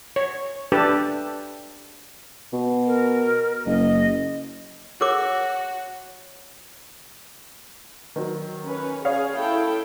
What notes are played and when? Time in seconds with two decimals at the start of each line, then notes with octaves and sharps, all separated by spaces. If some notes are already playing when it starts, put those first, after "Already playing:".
0.16 C#5
0.72 D4 G4 A4 B4 A5
2.53 B2
2.86 A#4
3.66 F#1 D#5
5.01 F#4 G#4 A#4 C#5 D6
8.16 D#3 F#3
8.66 C#4 B4
9.05 G#4 C#5 F5 D#6
9.35 E4 A4 G5